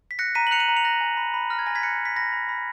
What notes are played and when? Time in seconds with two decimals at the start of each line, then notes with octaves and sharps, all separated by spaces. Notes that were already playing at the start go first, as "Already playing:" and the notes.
0.11 B6
0.19 F#6 A#6 C#7
0.35 A#5 B6 D#7
0.47 F#7
0.51 F#6 C#7 F7
0.60 D#7 F#7
0.68 A#5
0.76 C#7 F7
0.84 F#6 A#6
1.01 G#5
1.17 B5
1.34 B5
1.50 F6 A#6
1.59 G#6
1.66 G#5 A#6
1.75 G#6 B6
1.83 F#6 A#6 C#7
2.00 A#5
2.05 B6
2.16 B5 A#6
2.33 B5
2.49 B5